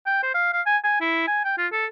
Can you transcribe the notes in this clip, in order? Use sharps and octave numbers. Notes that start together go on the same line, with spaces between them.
G5
C5
F5
F5
G#5
G#5
E4
G#5
G5
F4
A4